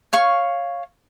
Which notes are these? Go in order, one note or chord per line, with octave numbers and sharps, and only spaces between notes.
C#5 F5 C#6